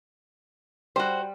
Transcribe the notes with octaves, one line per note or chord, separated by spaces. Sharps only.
G3 F#4 C5